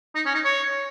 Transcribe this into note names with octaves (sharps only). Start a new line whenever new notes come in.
D#4
C#4
D#4
C#5